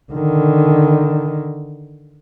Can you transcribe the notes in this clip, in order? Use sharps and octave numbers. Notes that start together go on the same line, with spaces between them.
D3 D#3